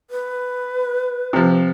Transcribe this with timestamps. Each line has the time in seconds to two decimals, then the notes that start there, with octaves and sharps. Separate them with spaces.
0.11 B4
1.33 C3 F3